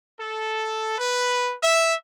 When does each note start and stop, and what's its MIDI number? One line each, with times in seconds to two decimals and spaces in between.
0.20 0.97 69
0.98 1.53 71
1.62 1.94 76